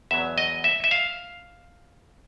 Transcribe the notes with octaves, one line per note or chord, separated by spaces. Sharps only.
E2 B2 F#3 E5
D#5
E5
E5
F5